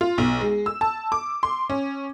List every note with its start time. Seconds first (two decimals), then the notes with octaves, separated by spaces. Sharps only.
0.01 F4
0.18 B1
0.41 G#3
0.66 E6
0.81 A5
1.12 D6
1.43 C6
1.70 C#4